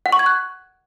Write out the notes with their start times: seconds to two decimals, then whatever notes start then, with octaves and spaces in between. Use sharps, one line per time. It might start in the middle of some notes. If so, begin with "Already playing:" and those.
0.06 F#5
0.12 C#6
0.19 G#6
0.26 F#6